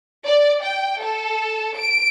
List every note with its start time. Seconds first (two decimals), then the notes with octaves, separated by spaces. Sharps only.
0.25 D5
0.63 G5
1.01 A4
1.77 D7